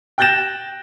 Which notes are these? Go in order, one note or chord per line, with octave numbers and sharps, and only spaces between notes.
G5 F#6 G6 A6 A#6 E7